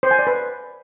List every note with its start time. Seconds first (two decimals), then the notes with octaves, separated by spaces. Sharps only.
0.03 C5
0.11 G#5
0.19 D5
0.27 B4